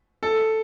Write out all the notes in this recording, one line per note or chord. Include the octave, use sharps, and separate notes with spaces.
A4